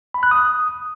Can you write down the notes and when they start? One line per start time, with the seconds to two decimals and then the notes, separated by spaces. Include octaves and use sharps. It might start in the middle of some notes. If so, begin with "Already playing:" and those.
0.14 B5
0.23 F#6
0.31 D#6